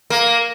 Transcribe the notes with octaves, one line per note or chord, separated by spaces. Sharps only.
A#3